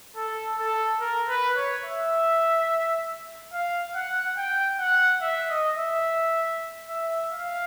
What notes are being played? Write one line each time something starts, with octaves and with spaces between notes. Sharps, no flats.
A4
A4
A#4
B4
C#5
E5
F5
F#5
G5
F#5
E5
D#5
E5
E5
F5